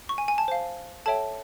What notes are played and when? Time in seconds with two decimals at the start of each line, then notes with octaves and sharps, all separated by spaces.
0.09 C#6
0.18 G#5
0.28 G#5
0.38 A5
0.48 C5 F5
1.06 A4 C#5 E5 G5 A5